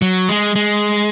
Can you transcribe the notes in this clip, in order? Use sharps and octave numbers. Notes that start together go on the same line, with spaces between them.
F#3
G#3
G#3